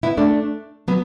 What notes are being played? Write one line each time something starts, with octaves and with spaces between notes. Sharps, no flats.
B3 E4
A3 D4
F#3 B3